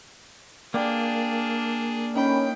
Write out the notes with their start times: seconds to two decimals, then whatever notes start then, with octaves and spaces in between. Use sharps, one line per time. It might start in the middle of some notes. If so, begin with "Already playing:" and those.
0.74 A#3 D4 G#4 D5 G5
2.15 D#3 C#4 G5 B5